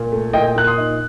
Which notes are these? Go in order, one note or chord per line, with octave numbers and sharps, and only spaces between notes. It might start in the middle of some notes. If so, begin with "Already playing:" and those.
Already playing: A#2
A3
A#2 D#5 G5
A#2 F#6
C6 D#6
D#4